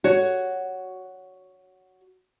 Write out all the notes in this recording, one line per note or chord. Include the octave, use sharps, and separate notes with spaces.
F#4 C#5